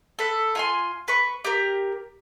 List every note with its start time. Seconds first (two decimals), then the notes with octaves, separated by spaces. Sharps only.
0.19 A4 B4
0.55 F4 G#5 C6
1.08 B4 C#6
1.45 G4 A#4